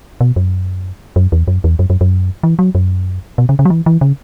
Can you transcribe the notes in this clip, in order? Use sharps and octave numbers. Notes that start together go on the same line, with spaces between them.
B2
F#2
F#2
E2
F#2
E2
F#2
F#2
F#2
E3
F#3
F#2
B2
C#3
C#3
F#3
E3
E3
C#3